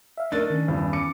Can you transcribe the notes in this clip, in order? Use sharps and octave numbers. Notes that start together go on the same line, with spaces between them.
E5 F5
A3 D4 D#4 A#4 A6
D#3 C#4
E2 G2
D6 C#7